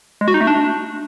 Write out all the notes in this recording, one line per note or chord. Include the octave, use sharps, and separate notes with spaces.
G#3
F#4
D#4
A3
D4